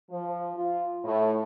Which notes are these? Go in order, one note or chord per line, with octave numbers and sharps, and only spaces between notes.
F3
F4
A2